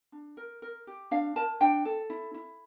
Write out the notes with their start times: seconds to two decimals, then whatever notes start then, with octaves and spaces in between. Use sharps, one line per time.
0.12 D4
0.37 A#4
0.62 A#4
0.87 G4
1.11 D4 F5
1.36 A#4 A5
1.61 D4 G5
1.85 A4
2.10 E4
2.34 E4